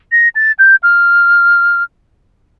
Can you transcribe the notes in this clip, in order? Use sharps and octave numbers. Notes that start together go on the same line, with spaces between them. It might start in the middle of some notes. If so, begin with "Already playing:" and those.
A#6
A6
G6
F6